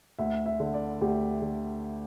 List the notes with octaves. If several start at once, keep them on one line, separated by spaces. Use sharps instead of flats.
D2 E5
E5
D3
D5
D2 G4
D3